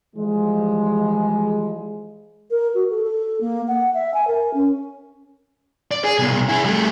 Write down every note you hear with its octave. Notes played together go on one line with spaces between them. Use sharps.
E3 F3 G3 G#3
A#4
F#4
A4
A4
A#3
F#5
E5
G#5
A#4
C#4
D5
G#4
C2 B2
E4 G#4
G3 A3